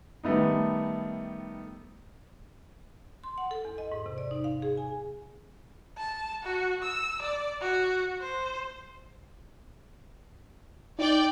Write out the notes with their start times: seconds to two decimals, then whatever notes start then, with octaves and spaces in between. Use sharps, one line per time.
0.24 D#3 G3 A3 B3 D#4
3.24 C6
3.38 F#5
3.51 A4
3.65 E2
3.78 D#5
3.92 G#2
4.06 C3
4.18 D5
4.31 D#4
4.44 F5
4.62 G#4
4.77 G#5
5.98 A5
6.44 F#4
6.83 E6
7.22 D5
7.61 F#4
8.22 C5
10.99 D#4 D5 G5